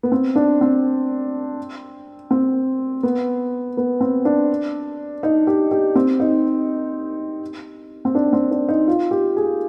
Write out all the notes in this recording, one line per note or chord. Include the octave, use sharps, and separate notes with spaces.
B3
C4
D4
C4
C4
B3
B3
C4
D4
D#4
G4
G4
C4
D#4
C4
D4
C4
D4
D#4
F4
G4
G#4